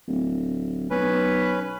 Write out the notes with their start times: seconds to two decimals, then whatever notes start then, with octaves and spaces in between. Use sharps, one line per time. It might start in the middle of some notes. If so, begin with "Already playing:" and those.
0.07 D1
0.90 B1 C#4 B4